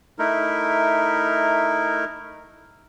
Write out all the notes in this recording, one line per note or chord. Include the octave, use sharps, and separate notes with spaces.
A3 D#4 E4 A#4